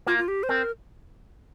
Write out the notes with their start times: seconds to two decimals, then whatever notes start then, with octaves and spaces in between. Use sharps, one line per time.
0.07 A#3 F4
0.18 F4
0.28 G4
0.43 C5
0.49 C4 A#4